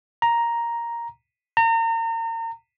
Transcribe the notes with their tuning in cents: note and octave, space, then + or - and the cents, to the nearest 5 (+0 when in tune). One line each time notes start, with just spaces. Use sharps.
A#5 +5
A#5 -35